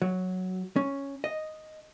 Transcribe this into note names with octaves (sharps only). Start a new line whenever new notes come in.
F#3
C#4
D#5